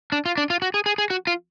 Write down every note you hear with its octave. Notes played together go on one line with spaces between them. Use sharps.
D4
F4
D4
F4
F#4
G#4
G#4
G#4
F#4
F4